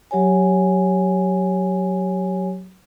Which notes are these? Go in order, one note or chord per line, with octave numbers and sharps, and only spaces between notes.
F#3 G4 C#5 G#5